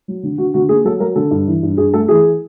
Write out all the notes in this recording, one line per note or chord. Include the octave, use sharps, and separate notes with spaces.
F#3
D3
D3 F#4
D3 F#4
A#3 G#4
F#3 A4
F#3 A#4
D3 A4
G2
E3
G2
G2 G#4
A3 A4
E3 G#4